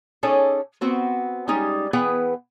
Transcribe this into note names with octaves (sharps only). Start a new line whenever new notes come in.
C#4 D#4 G#4 A4 C#5 D5
B3 C4 F#4 C5
G3 G#3 C#4 D#4 G4
E3 B3 G#4 B4 F#5 G5